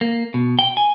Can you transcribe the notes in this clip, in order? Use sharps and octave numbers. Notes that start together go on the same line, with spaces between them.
A#3
B2
G5
G#5